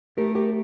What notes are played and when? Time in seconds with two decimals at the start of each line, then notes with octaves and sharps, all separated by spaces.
0.18 A3 G4 A#4
0.35 G4 A#4